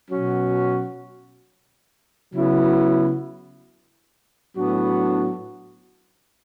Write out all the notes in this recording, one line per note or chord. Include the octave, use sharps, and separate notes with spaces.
B2 F#3 C#4 F#4
C#3 F#3 B3 E4
A2 F#3 B3 D4 F#4